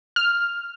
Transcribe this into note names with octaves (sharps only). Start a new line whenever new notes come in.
F6